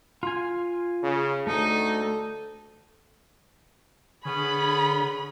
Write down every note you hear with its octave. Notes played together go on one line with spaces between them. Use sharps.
F4 G#5
C#3
D2 A3 D#4 A4
D3 B3 C#4 G#4 B5